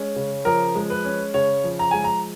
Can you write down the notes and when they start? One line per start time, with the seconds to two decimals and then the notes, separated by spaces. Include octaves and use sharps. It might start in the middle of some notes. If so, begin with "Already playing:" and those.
Already playing: G#3 C#4
0.16 C#3
0.45 F3 A#4
0.75 G#3
0.90 B4
1.05 C#4
1.34 C#3 C#5
1.64 F3
1.79 A#5
1.91 G#3 G#5
2.04 A#5